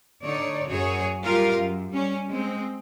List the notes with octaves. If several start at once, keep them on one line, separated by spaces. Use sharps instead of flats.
D3 D#4 C#5 D5
F#2 F#4 G#4 C#5
G3 F4 G4 A#4 F5
F#2
G3 C#4
G#3 C4